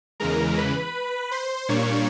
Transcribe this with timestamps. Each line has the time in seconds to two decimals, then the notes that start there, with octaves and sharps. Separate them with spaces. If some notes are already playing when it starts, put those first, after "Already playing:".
0.20 E2 C#3 E3 G#3 A#4 A#5
0.57 B4 B5
1.31 C5 C6
1.69 A#2 G3 A#3 D4 C#5 C#6